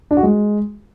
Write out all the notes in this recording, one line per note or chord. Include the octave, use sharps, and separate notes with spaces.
D4
F#4
G#3